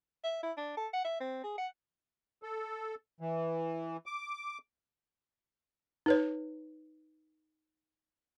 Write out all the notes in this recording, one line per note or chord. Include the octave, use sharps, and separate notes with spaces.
E5
E4
D4
A4
F#5
E5
C4
G#4
F#5
A4
E3
D6
D#4 B4 C#5